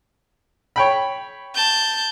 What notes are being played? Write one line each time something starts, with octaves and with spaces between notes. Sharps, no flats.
C#5 G5 B5
A5 G6